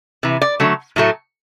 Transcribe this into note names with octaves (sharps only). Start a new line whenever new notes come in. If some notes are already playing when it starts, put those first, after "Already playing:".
C3 E3
D5
D3 F#3 A3
A2 F#3 A3